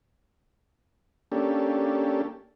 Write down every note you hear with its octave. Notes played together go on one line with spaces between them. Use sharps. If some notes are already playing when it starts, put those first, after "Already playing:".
A#3 C#4 D4 G4 A4